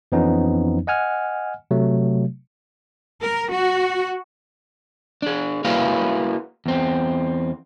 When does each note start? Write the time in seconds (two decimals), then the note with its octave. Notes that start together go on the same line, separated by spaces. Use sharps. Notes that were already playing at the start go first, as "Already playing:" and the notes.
0.12 F2 E3 F3 B3 C#4 D#4
0.87 D#5 F#5 G#5 F6
1.71 C3 F#3 A3
3.22 A#4
3.52 F#4
5.22 D4 G#4
5.65 A#3 E4 F#4 G#4 B4 F5
6.66 E2 C4